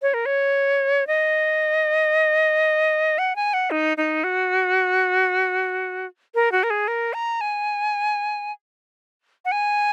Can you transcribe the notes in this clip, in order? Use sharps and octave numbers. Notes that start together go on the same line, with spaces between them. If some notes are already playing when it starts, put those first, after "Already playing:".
C#5
A#4
C#5
D#5
F#5
G#5
F#5
D#4
D#4
F#4
A#4
F#4
A#4
G#4
A#4
A#5
G#5
F#5
G#5